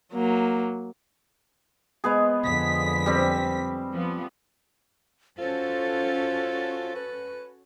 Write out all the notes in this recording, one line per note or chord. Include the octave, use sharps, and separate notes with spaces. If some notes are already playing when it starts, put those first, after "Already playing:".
F#3 A#3
G#3 B3 G#4
F2 D3 B6
G3 C4
F3 B3
C#4 F4 F#4 A4 C5
B4